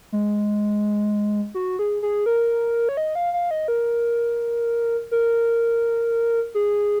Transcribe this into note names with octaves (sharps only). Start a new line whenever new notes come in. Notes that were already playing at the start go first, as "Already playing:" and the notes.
G#3
F#4
G#4
G#4
A#4
C#5
D#5
F5
F5
D#5
A#4
A#4
G#4